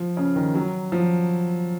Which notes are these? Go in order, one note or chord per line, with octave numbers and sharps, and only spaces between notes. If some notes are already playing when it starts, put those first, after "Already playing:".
Already playing: F3
C#3
D#3
F#3
F3